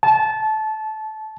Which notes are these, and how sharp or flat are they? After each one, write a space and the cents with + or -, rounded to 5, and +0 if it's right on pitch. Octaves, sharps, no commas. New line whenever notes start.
A5 -20